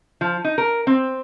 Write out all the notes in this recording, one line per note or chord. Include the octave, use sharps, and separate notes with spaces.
F3
D#4
A#4
C4